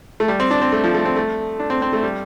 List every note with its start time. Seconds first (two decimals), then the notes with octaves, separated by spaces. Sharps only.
0.20 A3
0.28 G3
0.40 C4
0.51 D4
0.62 C4
0.72 A3
0.84 F3
0.95 A3
1.05 C4
1.16 A3
1.59 D4
1.70 C4
1.82 C4
1.93 A3
2.03 G3